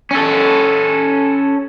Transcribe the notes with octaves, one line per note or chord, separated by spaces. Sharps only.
C#4 A4